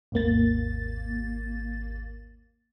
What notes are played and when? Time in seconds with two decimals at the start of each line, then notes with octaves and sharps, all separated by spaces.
0.12 G#1 D#2 A#3 A6